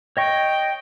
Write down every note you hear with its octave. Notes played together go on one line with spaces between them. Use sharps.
C#5 D#5 G5 C#6